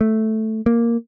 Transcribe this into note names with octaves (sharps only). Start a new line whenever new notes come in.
A3
A#3